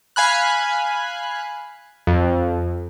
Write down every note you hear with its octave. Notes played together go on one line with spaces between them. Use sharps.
F5 G#5 B5 F#6
F2